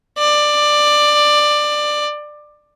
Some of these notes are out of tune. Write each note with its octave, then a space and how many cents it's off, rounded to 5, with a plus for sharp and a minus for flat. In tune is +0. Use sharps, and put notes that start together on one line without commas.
D5 +15